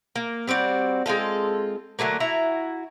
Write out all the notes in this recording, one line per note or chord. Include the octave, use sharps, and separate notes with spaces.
A#3
G3 C4 F#4 D5
G#3 C4 F4 A4
D3 F#3 A3 A#3
E4 F#4 A#5